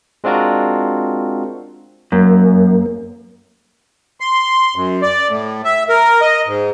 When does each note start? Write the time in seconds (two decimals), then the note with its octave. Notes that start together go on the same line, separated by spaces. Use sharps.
0.24 G#3 C4 D4 F4 F#4 A#4
2.12 F#2 A#3
4.20 C6
4.75 F#2
5.02 D5
5.28 A2
5.65 E5
5.89 A#4
6.21 D#5
6.46 G#2